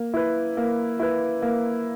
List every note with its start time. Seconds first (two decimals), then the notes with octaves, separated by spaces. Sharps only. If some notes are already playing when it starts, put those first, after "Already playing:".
Already playing: A#3
0.14 E4 B4
0.57 A#3
0.99 E4 B4
1.42 A#3